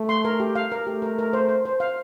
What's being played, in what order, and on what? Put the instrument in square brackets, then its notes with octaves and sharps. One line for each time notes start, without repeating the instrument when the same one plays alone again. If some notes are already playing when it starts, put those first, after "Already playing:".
Already playing: [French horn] A3
[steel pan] C6
A#4
G4
F5
A#4
[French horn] A3 [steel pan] G4
[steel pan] A#4
A#4
C5
C5
C5
F5